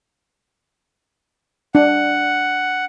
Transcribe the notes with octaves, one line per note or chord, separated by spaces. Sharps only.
D4 F#5